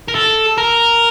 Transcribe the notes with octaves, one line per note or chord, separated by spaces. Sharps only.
A#4
A4
A#4